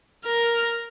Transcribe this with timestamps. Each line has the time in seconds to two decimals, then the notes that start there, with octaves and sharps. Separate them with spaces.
0.26 A#4